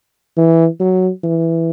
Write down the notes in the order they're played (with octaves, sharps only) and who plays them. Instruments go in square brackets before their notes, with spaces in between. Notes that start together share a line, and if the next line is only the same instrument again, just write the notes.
[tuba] E3
F#3
E3